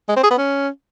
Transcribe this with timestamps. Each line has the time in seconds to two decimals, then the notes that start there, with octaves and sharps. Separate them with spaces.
0.09 G#3
0.16 C4
0.23 G#4
0.31 B3
0.38 C#4